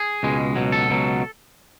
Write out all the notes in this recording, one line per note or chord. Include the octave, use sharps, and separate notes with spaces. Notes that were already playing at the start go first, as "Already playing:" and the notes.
Already playing: G#4
C#2 B2 G#3
C#2 B2 F#3
A4
C#2 B2 F#3